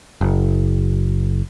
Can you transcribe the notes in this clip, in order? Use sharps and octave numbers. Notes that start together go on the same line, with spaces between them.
F#1